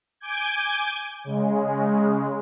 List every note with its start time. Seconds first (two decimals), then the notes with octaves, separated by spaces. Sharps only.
0.20 G#5 D6 G6 G#6
1.24 C#3 G#3